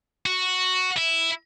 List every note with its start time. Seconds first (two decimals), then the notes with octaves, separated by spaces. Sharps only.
0.26 F#4
0.97 E4